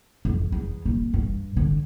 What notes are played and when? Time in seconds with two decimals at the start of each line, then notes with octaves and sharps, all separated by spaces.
0.25 F2
0.52 E2
0.85 D#1
1.14 G2
1.57 D3